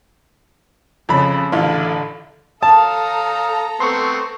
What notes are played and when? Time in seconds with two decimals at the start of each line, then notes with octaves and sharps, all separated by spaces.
1.09 F2 C#3 B5
1.52 A1 D3 E4 F4
2.63 A4 F5 A5 A#5 D#6
3.80 A3 B3 C4 C6 C#6